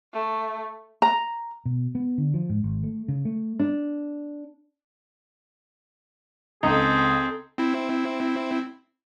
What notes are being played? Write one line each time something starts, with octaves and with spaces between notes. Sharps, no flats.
A3
A#5
B2
B3
D3
F3
G#2
G#1
A3
C#3
A3
D4
C#2 C4 D#4 G#4 A4
C4 E4